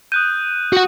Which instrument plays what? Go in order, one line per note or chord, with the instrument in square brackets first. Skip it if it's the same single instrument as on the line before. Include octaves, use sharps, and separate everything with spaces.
[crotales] D#6 F#6 D#7 [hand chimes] G6
[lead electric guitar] F#4 F#5